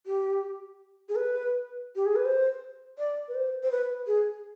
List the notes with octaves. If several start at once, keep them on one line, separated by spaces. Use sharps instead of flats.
G4
G#4
B4
G4
G#4
B4
C5
D5
B4
C5
C5
B4
G#4